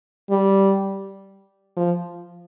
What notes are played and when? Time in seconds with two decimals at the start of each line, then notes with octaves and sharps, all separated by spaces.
0.30 G3
1.77 F3